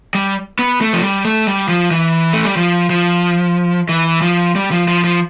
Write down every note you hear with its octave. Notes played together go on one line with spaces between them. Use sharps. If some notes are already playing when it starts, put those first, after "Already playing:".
G3
B3
A3
F3
G3
A3
G3
F3
E3
A3
G3
F3
F3
E3
F3
G3
F3
F3
F3